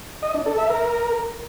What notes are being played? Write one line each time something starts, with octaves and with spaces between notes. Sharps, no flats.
D#5
D4
A4
E5
A#4